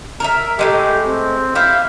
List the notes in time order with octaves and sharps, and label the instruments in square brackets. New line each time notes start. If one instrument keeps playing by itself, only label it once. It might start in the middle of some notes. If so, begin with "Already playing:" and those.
[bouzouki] A#4 C#5 E5
[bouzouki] A2 E3 G#3 [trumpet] G4
[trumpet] C4
[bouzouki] E4 G4 E5 [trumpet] F5